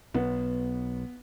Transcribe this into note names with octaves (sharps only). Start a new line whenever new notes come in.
B1 B3